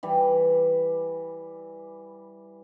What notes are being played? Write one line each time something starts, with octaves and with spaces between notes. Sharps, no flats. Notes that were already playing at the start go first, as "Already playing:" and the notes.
E3 G3